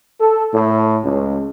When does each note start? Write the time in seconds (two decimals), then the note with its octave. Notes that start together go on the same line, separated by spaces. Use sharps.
0.20 A4
0.54 A2
1.04 C#2